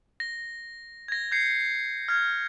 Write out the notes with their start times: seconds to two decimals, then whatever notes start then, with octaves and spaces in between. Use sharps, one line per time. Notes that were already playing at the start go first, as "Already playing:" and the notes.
0.20 A#6
1.08 G#6 A#6
1.31 G6 G#6 C7 C#7
2.08 F6 G#6